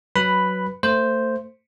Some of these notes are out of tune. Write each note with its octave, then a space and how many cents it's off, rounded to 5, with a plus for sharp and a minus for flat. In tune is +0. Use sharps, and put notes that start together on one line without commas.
F#3 +10 B4 +0 B5 +5
A3 +30 C5 +0